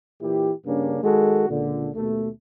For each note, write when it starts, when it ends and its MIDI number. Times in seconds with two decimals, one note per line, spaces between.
0.22 0.52 46
0.22 0.52 52
0.22 0.52 64
0.22 0.52 67
0.66 0.99 43
0.66 0.99 49
0.66 0.99 58
0.66 0.99 61
0.66 0.99 62
1.03 1.48 51
1.03 1.48 56
1.03 1.48 66
1.03 1.48 69
1.49 1.90 37
1.49 1.90 46
1.49 1.90 50
1.95 2.28 39
1.95 2.28 47
1.95 2.28 57